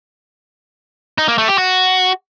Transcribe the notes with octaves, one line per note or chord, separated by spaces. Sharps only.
D#4
A#3
A3
G4
F#4